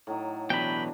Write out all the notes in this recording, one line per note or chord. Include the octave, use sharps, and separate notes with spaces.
A2 F#3 D#4
B2 E3 F#3 D4 G4 G5 B5